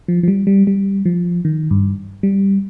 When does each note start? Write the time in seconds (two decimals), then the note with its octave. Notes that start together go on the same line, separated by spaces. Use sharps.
0.08 F3
0.23 F3
0.28 G3
0.47 G3
0.67 G3
1.06 F3
1.45 D#3
1.71 G2
2.23 G3